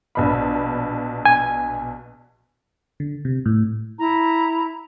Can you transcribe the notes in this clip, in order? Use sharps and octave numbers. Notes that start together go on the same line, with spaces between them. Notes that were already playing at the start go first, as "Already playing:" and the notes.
A#1 B2 B5
G#5
D3
C3
A2
E4 A#5